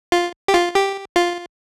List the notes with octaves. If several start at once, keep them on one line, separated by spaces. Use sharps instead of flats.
F4
G4
F4
G4
F4